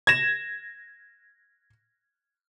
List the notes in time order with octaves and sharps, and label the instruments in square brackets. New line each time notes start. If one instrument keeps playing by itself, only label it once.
[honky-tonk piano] G#6 A#6 E7